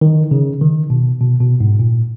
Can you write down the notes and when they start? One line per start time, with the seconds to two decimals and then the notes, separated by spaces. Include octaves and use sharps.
0.01 D#3
0.31 C#3
0.61 D#3
0.90 B2
1.21 B2
1.40 B2
1.60 G#2
1.80 A#2